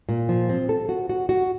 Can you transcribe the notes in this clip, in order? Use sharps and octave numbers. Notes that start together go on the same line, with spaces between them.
A#2
F3
C4
A4
F#4
F#4
F#4